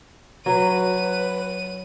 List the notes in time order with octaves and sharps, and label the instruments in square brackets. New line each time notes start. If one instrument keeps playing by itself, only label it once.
[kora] F#3 [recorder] B4 [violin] D#7